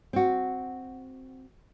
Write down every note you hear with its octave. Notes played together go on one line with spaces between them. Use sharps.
C4 F#4